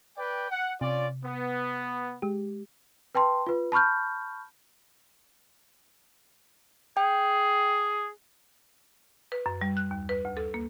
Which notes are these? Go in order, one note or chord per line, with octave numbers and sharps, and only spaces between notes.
B4 D5 G5
F#5
C3 C#4 F4 D5
B3
G#3 G4
B4 G5 A5 C6
F4 B4
A5 B5 C#6 F6 G6
G#4 G5
B4
F#2
G3
F#6
D#2
B4
D2
A4
A#3